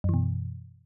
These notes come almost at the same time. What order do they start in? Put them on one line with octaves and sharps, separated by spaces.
F#2 E3 B2